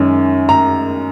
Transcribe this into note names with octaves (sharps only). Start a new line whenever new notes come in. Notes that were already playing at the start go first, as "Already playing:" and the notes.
Already playing: F#2 D#3 G#3 C#4
A#5